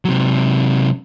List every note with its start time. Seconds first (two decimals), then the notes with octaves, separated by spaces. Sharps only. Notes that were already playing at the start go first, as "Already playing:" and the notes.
0.05 C3 F#3